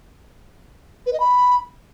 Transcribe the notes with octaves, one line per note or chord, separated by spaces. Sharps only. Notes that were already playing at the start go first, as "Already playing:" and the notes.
B4
D#5
B5